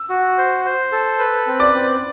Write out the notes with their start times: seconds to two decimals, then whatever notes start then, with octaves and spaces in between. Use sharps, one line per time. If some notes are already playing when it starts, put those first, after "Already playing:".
Already playing: E6
0.09 F#4
0.38 C5
0.65 C5
0.92 A4
1.19 B4
1.47 C4
1.60 D5 D6
1.74 C4